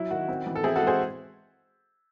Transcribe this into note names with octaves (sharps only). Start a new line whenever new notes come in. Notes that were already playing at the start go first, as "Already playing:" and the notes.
Already playing: F#3 E4
D#3 F#4
C4
E3
A4
C4 E4 G#4
F#4 A4
G#3
G#4 C5